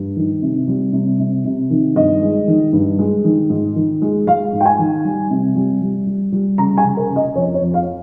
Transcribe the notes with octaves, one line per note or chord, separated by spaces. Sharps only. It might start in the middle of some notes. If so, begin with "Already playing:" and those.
Already playing: G2
D#3
C3
G3
C3
C3
C3
D#3
G2 D#5
G#3
D#3
G2
G#3
D#3
G#2
D#3
G#3
G#3 F5
G#2
G5
G#5
D#3
G3
C3
G3
G3
G3
G3
C#3 A#5
G#5
C#3
A#4
C#3
D#5
F2 C#5
C#5
F2
F5